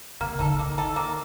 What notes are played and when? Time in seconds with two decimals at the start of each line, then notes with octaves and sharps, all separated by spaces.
0.21 C3 A#3
0.39 D3 D#4 A4
0.59 D#3 A#3
0.78 D#4 A4
0.96 A#3